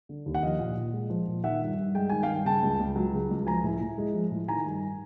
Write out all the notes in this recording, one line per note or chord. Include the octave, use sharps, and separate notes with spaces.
D3
D#2
F#5
F3 D#5 F5
A#2
A#2
G#3
F3
A#2
D#3 E5 F#5
G2
G2
G#3 G5
D#3 G#5
F5 G5
G2
C#3 G5 A5
C#2
C#2
F#3
C#3
C#2
F3 G#5 A#5
A2
A2
G#3
F3
A2
D#3 G#5 A#5
G2